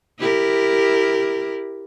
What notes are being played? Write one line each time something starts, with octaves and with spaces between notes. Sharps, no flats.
E4 G4 A#4